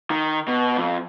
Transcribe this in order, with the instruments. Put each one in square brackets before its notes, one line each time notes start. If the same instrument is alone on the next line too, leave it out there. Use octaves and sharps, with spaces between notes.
[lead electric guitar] D#3
B2
F2